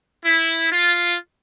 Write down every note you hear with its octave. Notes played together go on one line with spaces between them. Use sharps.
E4
F4